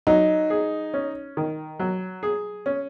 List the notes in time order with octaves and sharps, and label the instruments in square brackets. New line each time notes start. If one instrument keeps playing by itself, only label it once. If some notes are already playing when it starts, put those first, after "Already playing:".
[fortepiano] F#3 [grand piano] D#4
[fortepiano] G#4
C#4
D#3
F#3
G#4
C#4